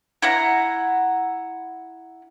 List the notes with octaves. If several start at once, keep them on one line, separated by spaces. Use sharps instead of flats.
E4 F#5 A#5